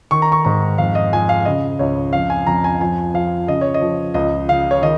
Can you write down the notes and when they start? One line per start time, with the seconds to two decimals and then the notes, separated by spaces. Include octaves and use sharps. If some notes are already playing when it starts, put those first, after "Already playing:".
0.11 D#3 C#6
0.22 A#5
0.32 C#6
0.45 G#2 A#5
0.78 F2 F5
0.95 D#5
1.12 F3 G#5
1.29 F5
1.45 C#3 D#5
1.79 C#2 C#5
2.13 F2 F5
2.30 G#5
2.47 F2 A#5
2.64 G#5
2.80 F3 G#5
3.14 F3 F5
3.47 C#3 D#5
3.61 C#5
3.74 D#5
3.81 F3
4.14 C#2 D#5
4.49 C#3 F5
4.71 C#5
4.82 D#3 D#5